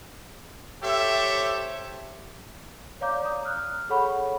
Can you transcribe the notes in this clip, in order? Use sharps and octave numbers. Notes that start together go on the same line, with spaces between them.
G4 A4 C5 C#5 E5
C#5 D5 F5 A#5 D6 G6
A#5 D#6
F6 F#6
G#4 A4 C#5 F#5 B5 C#6